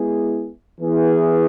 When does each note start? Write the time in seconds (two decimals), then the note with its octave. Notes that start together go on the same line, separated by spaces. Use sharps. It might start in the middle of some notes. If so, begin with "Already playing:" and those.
Already playing: G#3 B3 E4 G#4
0.80 E3 B3 E4 G#4